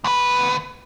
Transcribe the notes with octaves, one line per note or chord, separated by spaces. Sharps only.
D2 B4